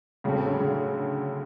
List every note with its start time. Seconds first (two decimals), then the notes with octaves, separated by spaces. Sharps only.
0.24 A2 C#3 F#3 A3 C4
0.47 D3
0.60 C#3